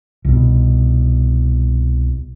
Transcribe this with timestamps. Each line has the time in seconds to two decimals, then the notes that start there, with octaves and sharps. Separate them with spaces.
0.25 C2 B2